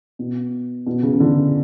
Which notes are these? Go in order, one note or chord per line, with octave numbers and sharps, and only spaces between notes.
B2
B2
C#3
C#3
D3